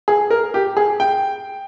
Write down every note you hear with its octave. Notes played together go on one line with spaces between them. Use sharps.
G#4
A#4
G4
G#4
G5